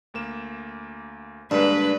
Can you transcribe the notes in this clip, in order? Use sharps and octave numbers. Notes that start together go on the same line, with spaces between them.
D2 A#3 E7
G2 D3 G#3 A#3 D4 B4